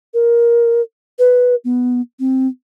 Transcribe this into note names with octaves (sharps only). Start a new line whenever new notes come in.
A#4
B4
B3
C4